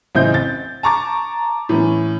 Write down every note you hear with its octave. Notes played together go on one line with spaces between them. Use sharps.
A1 C#3 C4 E4 D#5 G6
A6
A5 A#5 C#6 D6 A6
A2 E3 C#4